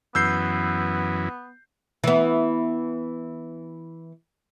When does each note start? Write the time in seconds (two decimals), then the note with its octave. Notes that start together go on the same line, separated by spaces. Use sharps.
0.15 F#2 E3 B3 E6 G6 C7
2.04 E3 B3